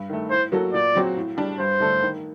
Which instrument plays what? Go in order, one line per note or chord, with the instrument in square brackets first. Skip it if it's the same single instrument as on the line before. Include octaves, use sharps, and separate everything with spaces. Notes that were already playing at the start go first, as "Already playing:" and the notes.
Already playing: [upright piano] G2
D#3 A3
[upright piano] A2 [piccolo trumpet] C5
[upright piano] F#3 A#3 F#4 A4
[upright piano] A#2 [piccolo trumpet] D5
[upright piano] F#3 C4 F#4
A2
G3 D4
[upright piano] G2 [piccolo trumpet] C5
[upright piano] D3 A3 D4 A4
D#3